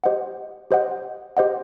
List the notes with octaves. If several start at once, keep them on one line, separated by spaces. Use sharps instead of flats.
G4 C5 D#5 F#5
G4 C5 D#5 F#5
G4 C5 D#5 F#5